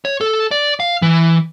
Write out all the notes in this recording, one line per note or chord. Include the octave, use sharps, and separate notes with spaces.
C#5
A4
D5
F5
E3